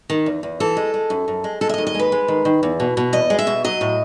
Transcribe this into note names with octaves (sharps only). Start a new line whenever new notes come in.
D#3
E2
E2
E3 A4
G#3
G#3
F#2
F#2
G#3
G#3 A4
E5
D#5
D#2
D#5
G#3 B4
G#3
D#3
D#3
E2
B2
B2
E2 D#5
G#3
E5
B2
F#3 D#5
A2